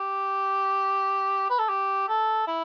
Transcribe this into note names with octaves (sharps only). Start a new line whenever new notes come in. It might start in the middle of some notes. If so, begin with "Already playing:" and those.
Already playing: G4
B4
A4
G4
A4
E4